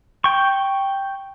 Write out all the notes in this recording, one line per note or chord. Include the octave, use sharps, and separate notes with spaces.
G5 C#6